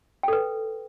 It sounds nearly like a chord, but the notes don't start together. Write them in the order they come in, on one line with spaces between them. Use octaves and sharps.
G5 A4 B4